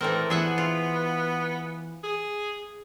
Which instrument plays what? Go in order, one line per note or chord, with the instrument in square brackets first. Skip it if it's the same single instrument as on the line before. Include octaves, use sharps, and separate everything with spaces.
[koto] E3 A3 C4 [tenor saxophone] A#4
[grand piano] E3 G7 [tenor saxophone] B3 [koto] G#4 E5 F#5
[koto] F4
[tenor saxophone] G#4